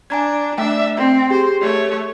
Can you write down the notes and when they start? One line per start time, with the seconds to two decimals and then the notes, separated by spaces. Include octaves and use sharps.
0.10 D4 G#5 A#5 G#6
0.58 A3 D4 E5 G5
0.97 C4
1.30 G4 G#4 C5
1.61 A3 C#5